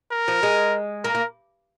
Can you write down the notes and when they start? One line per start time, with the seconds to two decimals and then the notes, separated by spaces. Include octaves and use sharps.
0.12 A#4
0.28 F3
0.43 G#3
1.04 A#3 A#4
1.15 A#3